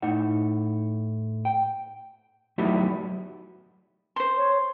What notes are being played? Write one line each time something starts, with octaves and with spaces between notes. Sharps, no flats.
A2 D#4 F#5
G5
F#3 A3 D#4 E4 F#4 G4
C5 C6
C#5